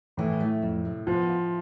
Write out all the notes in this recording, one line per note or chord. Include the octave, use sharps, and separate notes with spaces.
A2 E3
A3
F2
C3
F3 B3
F4